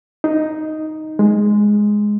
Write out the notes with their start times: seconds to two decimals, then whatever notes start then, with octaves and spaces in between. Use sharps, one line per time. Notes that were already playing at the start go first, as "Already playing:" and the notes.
0.24 D#4
1.19 G#3